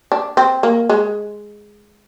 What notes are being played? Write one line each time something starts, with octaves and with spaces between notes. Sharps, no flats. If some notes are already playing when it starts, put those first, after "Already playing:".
D4
C4
A#3
G#3